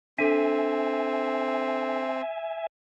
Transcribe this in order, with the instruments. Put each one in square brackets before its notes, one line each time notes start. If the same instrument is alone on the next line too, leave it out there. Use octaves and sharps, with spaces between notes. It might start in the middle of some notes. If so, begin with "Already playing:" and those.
[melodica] C4 [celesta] D4 A4 [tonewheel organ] E5 G#5